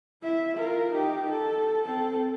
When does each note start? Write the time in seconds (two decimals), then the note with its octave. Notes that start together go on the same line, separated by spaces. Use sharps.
0.23 E4 E5
0.54 F4 A#4
0.92 D#4 G4
1.31 A4
1.84 C4 A4